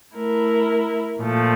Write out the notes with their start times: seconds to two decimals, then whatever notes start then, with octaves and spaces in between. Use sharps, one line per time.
0.14 A3 E4 A#4
1.20 A#2 F3 A3